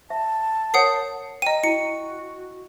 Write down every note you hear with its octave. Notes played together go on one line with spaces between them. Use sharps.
E5 A5
A#4 C#5 F#5 D#6 C7
D#5 G5 A#5 D#7
E4 F#4 C#7